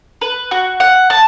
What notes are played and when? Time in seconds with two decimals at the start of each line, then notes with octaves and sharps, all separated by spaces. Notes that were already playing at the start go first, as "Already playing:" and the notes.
0.21 B4
0.51 F#4
0.80 F#5
1.10 A5